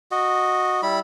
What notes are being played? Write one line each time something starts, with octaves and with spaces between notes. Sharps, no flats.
F#4 D#5
G3 E4 B5